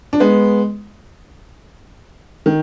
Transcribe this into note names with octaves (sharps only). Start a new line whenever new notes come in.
D4
G#3 B3
D#3